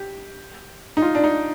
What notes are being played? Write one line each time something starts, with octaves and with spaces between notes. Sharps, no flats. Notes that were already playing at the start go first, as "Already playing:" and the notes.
Already playing: G4
D#4
F4
D4
D#4